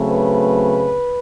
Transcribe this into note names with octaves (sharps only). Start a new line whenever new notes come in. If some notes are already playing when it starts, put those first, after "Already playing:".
Already playing: C#3 F#3 A3 C4
B4